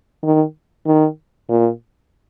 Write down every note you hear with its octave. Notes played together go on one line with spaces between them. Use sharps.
D#3
D#3
A#2